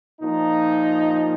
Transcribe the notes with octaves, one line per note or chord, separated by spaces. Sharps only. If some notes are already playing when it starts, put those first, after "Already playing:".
A#2 F3 D#4